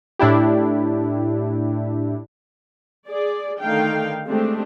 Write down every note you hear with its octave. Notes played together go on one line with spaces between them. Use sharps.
A2 D4 E4 G4
G#4 D5
D3 D#3 A3 F5 G5
G#3 A3 C4 D4 G4